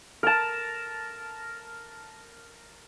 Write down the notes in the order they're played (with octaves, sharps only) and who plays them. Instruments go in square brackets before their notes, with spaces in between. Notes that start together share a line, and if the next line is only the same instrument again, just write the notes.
[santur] A#4 A5